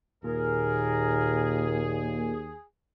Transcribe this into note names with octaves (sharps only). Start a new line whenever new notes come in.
D#2 A#2 G#4 A#4